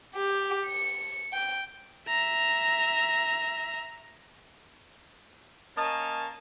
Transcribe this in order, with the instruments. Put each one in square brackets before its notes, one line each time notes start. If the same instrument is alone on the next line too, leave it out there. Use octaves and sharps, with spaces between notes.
[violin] G4
C#7
G5
[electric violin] E5 A#5
[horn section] A#3 C#4 C#5 D#5 A5